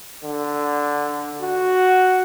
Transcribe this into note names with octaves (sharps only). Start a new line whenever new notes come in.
D3
F#4